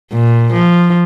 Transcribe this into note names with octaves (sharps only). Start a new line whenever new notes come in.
A#2
F3